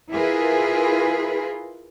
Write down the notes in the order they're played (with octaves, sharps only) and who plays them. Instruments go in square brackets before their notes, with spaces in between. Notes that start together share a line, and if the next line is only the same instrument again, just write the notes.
[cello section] E4 F4 G#4 A#4 B4